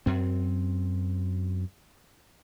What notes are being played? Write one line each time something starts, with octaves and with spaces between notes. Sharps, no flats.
F#2 C4